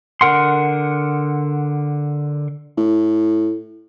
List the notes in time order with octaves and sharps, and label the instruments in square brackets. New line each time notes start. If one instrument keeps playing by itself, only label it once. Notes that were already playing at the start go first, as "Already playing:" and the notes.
[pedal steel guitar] D3 A#4 F#5 C6
[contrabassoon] A2